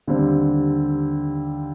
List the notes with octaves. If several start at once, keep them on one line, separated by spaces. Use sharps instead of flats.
D#2 D3 G3 C4